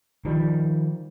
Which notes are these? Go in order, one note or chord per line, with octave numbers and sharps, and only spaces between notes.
D#3 F3 G3